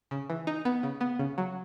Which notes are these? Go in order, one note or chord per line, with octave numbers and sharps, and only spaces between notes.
C#3
E3
D#4
B3
C#3
B3
C#3
F#3